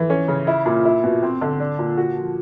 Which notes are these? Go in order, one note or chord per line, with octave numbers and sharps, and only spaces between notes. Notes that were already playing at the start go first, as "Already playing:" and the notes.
Already playing: E3
C#4
C#3
E4
A#2
E4
B2
C4
D3
D4
A#2
F#4
F3